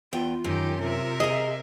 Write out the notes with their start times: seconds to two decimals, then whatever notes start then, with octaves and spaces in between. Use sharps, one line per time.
0.13 E2 F4 G5
0.44 F#2 D#3 G4
0.80 C3 A#4 E5
1.20 G#4 D#5 A#5